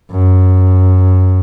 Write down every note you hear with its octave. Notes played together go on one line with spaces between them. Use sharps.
F#2